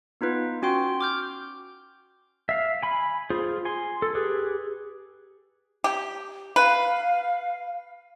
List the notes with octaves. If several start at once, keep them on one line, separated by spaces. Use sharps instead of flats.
B3 D#4 F4 B4
C#4 F#4 G5 C6
D6 F6 G6
E5 F5
G#5 B5
F4 G#4 C5
G#5 C6
A4
G4 G#4 B4
G4
B4 F5